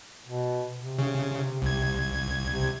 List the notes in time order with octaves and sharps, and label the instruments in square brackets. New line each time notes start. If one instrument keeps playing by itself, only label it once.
[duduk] B2
C3
[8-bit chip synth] C#3
C2 G#6
[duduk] C3